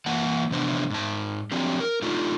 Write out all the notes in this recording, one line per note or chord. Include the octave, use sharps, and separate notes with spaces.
E3 A#3 F#5 A5
E2 C3 F3 B3 D4 C5
G#2 A5
F3 F#3 C4 D4 G4
A#4
A3 D4 D#4 F4